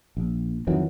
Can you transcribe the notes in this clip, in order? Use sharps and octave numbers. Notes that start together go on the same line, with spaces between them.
A#1
F2 D#3 E3 F#3